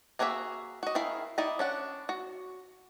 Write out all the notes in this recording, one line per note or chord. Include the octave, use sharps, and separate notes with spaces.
A#3 F#4 G#4 C5 E5
F#4 D#5
D#3 E4 G#4 F5
D#4 E4 D5 D#5
C#4 D4 F#5
F#4